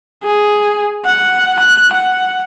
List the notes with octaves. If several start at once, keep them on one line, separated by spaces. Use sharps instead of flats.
G#4
F#5
F#6
F#5